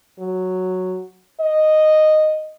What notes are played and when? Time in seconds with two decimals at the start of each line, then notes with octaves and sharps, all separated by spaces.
0.19 F#3
1.41 D#5